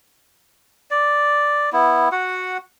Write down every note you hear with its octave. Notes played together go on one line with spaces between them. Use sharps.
D5
B3 E4
F#4 F#5